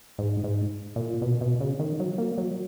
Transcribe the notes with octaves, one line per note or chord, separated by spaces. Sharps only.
G#2
G#2
A#2
B2
B2
C#3
D#3
F#3
A#3
F#3